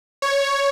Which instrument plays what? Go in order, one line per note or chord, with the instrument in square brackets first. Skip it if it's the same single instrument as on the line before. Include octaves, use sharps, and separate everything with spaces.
[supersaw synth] C#5